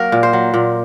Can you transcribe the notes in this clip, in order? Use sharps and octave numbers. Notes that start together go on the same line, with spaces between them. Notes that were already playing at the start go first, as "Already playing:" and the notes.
Already playing: F#3 A#3 F#4 A#4
A#2
C5
F#3
A#2